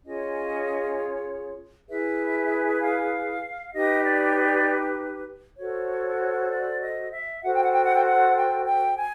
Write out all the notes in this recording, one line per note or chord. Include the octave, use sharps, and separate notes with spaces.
C#4 F4 G#4 C#5 D#5
E4 G#4 B4 E5
F5
D#4 G4 B4 D#5
D5
C#5
D5
F#4 A4 C5 C#5
D5
D#5
E5
F#4 A4 C5 F#5
G5
F#5
G5
F#5
G5
F#5
G5
G5
G#5